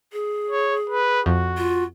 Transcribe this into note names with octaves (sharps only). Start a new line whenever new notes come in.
G#4
C#5
B4
F2 F#4
F4